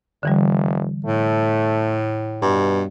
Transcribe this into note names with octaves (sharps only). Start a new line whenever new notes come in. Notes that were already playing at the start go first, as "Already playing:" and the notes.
F1 D3 E3 G3
A2 A3
G2 B2